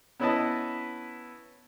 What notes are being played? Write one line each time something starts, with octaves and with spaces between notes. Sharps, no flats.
B3 C#4 E4 B4 D#5 A5